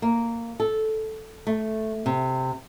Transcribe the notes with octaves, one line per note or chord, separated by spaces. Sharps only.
A#3
A4
A3
C3